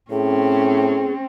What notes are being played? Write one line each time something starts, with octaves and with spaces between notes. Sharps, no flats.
A2 C4 C#4 G#4